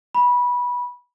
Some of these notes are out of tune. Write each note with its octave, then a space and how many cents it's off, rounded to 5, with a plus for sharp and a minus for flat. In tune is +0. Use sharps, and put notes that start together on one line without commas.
B5 -15